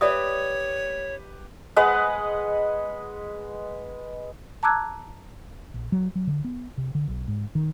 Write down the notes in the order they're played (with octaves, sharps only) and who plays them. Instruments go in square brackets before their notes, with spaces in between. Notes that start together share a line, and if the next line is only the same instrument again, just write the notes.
[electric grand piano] G4 B4 [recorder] C#5 [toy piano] D5 E5 D#6
[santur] G#3 B4 D#5 F#5
[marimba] A5 A#5 D6 E6 F#6 G#6
[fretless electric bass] A#1
F#3
F#3
D3
B3
C3
D3
B1
G#2
D#3